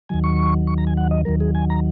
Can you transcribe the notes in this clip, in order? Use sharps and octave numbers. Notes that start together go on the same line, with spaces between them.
D#2 D#3 F#3 G#5
C#6
C#6
A#5
G#5
F#5
D#5
D#2 D#3 F#3 A#4
G#4
G#5
A#5